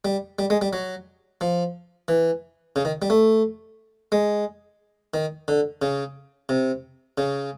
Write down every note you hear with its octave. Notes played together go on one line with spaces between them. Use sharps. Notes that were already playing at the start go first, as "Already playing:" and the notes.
G3
G3
G#3
G3
F#3
F3
E3
C#3
D#3
G3
A3
G#3
D#3
D3
C#3
C3
C#3